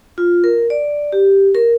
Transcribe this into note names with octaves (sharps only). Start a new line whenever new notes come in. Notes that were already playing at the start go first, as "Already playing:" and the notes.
F4
A#4
D5
G4
A#4